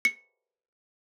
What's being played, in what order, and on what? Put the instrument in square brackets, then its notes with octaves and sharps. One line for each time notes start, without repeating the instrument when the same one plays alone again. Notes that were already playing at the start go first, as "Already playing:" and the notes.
[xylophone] C#7